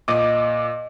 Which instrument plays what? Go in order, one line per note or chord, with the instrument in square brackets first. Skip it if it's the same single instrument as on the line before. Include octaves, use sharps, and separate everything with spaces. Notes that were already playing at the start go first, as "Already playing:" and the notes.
[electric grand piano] A#2 D6 [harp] D#5